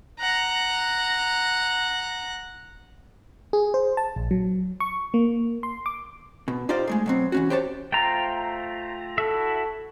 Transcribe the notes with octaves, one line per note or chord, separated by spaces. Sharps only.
F#5 A#5
G#4
C5
A5
A#1
F#3
C#6
A#3
C6
D6
B2
D#4 F4 G4 C5 D5 F5
G#3 A3 G#4
B2 F#3 C4
E3 C#4 F#4
G4 C5 C#5 A5
A3 F4 C5 G5 A#5
E4 F#4 A4 E5